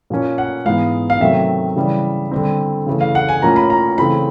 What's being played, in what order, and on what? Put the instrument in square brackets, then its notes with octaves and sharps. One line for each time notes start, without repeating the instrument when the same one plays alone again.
[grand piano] A#2 F3 A#3 C#4
F#5
G#2 E3 G#3 B3 F5
F5
C3 D#3 F#3 A3 C4 E5
C#3 E3 G3
D3 G3 C4
C#3 E3 A3
F5
F#5
G#5
A2 F3 A#3 C#4 A#5
B5
A#5
C#3 E3 A3 C4 B5